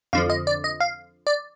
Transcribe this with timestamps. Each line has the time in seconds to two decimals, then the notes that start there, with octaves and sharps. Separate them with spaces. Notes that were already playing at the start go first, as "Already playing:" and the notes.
0.13 F2 D3 F3 F5
0.30 D#5
0.47 D5
0.64 D#5
0.80 F5
1.27 D5